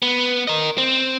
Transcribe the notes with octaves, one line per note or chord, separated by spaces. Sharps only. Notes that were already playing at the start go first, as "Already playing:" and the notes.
B3
A#4 D#5
C4